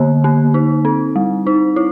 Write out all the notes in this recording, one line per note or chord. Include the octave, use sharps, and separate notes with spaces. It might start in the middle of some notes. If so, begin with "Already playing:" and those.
Already playing: D3 A#3
A#3
D#4
C4
G3
D#4
E4